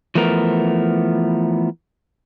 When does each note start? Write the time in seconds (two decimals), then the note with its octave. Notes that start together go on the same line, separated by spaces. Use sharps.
0.15 E3 F3 A3 B3 A#4